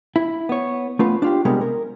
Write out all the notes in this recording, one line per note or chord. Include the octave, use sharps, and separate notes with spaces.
E4
B3 C#5
A3 B3 C#4 F4 B4
D4 F4 G4
C3 G3 G#3 B3 A#4
A#4